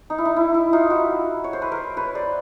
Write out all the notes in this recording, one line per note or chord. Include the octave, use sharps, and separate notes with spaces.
D#4
E4
D#4
E4
E4
D#4 F4
E4 F#4
C#5
C5
B4
A#4 C5
B4 C#5
C5 D5